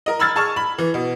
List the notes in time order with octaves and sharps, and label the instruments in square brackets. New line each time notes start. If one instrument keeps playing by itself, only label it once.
[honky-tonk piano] A#4 D#5
B5 E6 F6 G#6 A6
G#4 A5 C#6 F6
B5
E3
B2